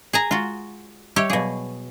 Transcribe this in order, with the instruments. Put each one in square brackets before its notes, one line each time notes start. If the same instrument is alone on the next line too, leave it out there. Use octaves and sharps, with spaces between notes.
[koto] G#4 G#5 A#5
[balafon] G#3 [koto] F4 F#4
[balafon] G3 E5 [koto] G4 C#5
[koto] B2 G#4 [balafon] F#3 F5